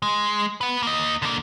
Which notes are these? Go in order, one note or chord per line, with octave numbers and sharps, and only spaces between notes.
G#3
B4 F#5
A#3 D#5
D3 A#3